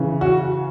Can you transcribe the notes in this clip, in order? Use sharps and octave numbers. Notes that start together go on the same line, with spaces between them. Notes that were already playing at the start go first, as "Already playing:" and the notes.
Already playing: C#3 E3
F#4